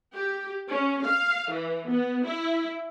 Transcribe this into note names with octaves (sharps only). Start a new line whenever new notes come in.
G4
C#4
F5
E3
B3
E4